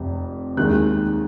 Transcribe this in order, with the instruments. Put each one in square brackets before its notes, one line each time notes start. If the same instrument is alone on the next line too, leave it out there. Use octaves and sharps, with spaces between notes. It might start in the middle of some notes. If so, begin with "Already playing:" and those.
Already playing: [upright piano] F1 F2 C3
D#2 D#3 G#3 F#6